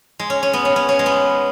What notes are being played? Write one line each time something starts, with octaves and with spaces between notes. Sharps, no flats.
G#3
C#4
C#4
B3
C#4
C#4
C#4
G#3
B3